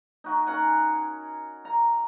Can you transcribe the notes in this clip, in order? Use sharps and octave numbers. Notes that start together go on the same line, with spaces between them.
D#4 F#4 G#5
C#4 A#4 F#5 G#5
A#5